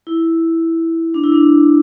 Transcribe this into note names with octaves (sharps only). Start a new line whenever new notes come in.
E4
D4
E4
D4